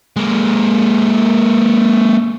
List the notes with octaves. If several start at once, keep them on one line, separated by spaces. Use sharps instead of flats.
G#3 A#3